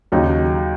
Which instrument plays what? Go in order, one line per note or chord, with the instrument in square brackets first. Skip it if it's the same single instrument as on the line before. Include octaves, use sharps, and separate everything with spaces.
[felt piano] D#2 C#3 F#3 D#4